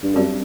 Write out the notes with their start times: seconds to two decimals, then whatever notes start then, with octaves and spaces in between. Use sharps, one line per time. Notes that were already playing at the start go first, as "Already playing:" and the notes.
0.03 G2
0.15 F#2 G3 C4 G4 D5